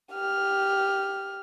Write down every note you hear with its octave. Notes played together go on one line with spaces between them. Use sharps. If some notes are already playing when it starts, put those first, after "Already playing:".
G4 F6